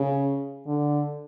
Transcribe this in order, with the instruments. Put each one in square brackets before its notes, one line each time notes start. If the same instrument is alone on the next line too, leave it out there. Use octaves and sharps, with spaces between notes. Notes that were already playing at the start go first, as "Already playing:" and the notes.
Already playing: [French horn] C#3
D3